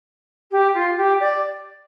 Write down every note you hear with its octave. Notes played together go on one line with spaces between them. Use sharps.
G4
F4
G4
D5